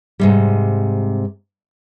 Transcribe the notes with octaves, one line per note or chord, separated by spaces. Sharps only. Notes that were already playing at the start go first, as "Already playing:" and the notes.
G#2 C3 G3